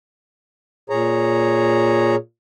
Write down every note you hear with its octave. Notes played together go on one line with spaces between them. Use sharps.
A#2 G#4 C#5 A#5